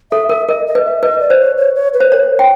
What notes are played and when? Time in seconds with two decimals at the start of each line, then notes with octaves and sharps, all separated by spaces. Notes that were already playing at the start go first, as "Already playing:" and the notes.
0.11 A4 E5
0.29 A#4 E5
0.48 A#4 D#5
0.67 D#5
0.75 B4
0.85 E5
1.03 B4 D#5
1.20 D5
1.30 C5
1.39 C#5
1.58 C#5
1.76 C#5
1.94 B4
2.00 C5
2.12 A#4 C#5
2.39 G5